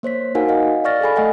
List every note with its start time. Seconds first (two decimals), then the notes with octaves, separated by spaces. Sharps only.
0.03 A#3 C5 C#5 B6
0.35 D#4 F#4 A#4 F5 F#5 G#5
0.49 D#5 F5
0.84 D5 F5 C#6 F6 A6 A#6
1.01 G#4 A4 G#5 B5
1.16 A3 D#5 F#5 G#5